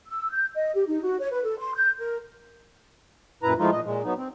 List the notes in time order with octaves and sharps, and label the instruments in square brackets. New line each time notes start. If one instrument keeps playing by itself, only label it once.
[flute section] E6
G6
D#5
G4
D#4
F#4
C#5
B4
A4
C6
G6
A#4
[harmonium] F#2 A#2 E4 B4 A#5
E3 F3 G#3 A3 D#4 F4
A#2 D#5
A#2 G#3
F#3 B3 D#4
C4